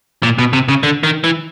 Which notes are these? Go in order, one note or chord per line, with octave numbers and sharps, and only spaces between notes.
A#2
B2
C3
C#3
D3
D#3
E3